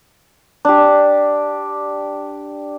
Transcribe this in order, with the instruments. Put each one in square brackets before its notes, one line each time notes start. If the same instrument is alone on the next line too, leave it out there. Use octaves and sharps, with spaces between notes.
[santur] D4 G4